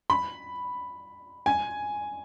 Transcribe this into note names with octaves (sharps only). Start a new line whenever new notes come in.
B5
G#5